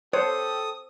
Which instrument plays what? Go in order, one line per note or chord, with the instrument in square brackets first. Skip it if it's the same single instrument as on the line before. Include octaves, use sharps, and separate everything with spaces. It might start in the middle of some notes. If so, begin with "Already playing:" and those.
[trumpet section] G4 A4 [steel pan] C5 [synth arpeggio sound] C#5 [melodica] D#6